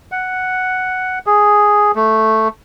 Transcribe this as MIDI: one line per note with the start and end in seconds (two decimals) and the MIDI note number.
0.12 1.19 78
1.26 1.92 68
1.96 2.48 57